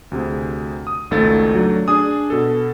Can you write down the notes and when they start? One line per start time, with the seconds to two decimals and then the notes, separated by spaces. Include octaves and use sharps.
0.11 D2 C3 G#4
0.87 D#6
1.11 G#1 C#2 A3 D#4 A6
1.55 F#3 A3 D4
1.88 D4 G#4 G#5 D#6
2.30 B2 A4